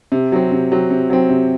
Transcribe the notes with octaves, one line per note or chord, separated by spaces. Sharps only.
C3
F#3 C4
C3
F#3 C4
C3
F#3 C4
C3